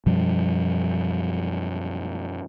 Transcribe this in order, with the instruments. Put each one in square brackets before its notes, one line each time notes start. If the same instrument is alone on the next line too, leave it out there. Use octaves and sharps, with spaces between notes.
[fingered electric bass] F#2 B2 F3 G3